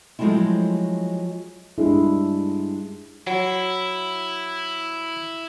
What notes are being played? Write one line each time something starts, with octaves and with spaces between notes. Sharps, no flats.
F3 F#3 G#3 A3 C4 E4
G2 G#3 D4 E4
F#3 E4